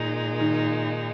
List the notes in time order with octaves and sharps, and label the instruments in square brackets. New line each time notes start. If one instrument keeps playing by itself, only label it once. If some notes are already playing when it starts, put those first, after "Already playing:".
Already playing: [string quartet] A#2 G#3 D#4 [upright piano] D#3
[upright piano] D#3